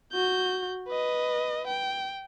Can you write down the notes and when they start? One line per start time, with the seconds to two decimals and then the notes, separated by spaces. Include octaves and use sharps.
0.13 F#4 G6
0.88 B4 D#5
1.67 G5